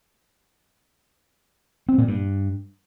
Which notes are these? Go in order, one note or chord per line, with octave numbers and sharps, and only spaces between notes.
C4
A#2
G2